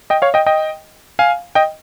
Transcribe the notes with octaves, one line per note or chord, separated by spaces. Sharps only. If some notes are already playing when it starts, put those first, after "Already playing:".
D#5 G5
C#5 F5
D#5 G5
D#5 G5
F5 G#5
D#5 G5